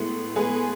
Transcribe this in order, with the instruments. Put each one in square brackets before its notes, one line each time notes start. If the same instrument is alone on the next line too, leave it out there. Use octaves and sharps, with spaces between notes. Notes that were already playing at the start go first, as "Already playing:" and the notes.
Already playing: [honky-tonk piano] A2 G#3 B3 E4
A2 G#3 B3 G#4 B4